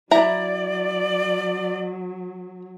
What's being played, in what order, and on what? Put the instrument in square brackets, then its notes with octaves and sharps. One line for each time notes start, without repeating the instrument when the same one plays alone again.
[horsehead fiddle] F#3 [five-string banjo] E4 A#5 [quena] D5